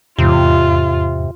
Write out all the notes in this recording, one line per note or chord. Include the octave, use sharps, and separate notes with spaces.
E2 G#2 C3 F4